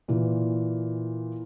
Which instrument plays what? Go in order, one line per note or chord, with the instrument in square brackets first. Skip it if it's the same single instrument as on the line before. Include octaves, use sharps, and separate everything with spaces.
[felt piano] A#2 E3